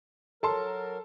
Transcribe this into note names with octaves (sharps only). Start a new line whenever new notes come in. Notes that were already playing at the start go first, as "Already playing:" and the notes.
F#3 A4 A#4 A5 C6